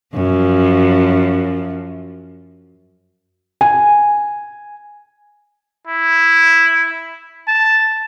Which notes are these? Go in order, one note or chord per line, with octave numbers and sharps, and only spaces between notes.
F#2 F3
G#5
E4
A5